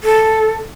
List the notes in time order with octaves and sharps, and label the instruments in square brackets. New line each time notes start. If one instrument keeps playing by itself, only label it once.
[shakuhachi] A4